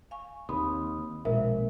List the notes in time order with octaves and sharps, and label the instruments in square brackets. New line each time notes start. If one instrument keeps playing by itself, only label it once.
[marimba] F5 G#5 C#6
[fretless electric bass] D#2 [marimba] C4 [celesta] B5 D#6
[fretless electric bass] A#1 [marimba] B2 F3 G#3 [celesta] A#4 C5 E5